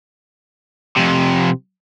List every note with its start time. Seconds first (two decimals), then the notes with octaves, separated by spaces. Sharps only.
0.97 F2 C3